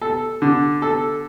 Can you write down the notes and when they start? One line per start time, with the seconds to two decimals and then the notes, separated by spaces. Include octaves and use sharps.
0.01 A4
0.42 D3
0.82 A4